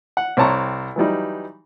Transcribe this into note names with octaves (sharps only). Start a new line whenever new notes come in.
F#5
C2 C4 C#5 A5 A#5 C#6
E3 F#3 G3 D#4